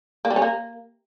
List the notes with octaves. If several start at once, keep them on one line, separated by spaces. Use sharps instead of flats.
A#3
G3
C#4
A#3